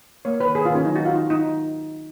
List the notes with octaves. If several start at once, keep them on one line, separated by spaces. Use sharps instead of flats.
A#3 C#5
D#3 B4
D#3 G#4
F4
D#3 C#4
F#3 D#4
F#4
D#3
F4
D#3 D#4
D#3 D#4